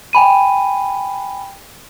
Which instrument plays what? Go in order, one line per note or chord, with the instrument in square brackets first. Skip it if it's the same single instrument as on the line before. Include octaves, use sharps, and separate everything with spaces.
[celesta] G5 G#5 B5 D#7